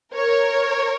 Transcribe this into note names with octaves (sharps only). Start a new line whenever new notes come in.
A#4 C#5